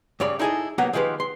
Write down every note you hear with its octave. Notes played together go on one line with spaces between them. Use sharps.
G2 C#3 C#5 D5 B5
D#4 E4 G#4 A4 D#5
F#3 A#3 B3 G4 F#5 A#5
D#3 F3 G#3 G4 B4
C6